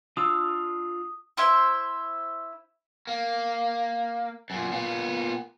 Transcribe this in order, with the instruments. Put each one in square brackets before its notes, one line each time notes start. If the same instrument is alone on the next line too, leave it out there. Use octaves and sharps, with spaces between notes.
[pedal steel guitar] D4 F4 E6 [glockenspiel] D#6
[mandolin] E4 C5 E5
[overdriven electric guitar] A#3
F#2 A#2
A#2 B3